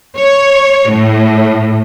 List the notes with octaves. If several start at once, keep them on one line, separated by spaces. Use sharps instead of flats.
C#5
A2